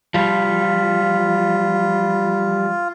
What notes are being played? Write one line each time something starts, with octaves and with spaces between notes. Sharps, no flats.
F3 G3 F4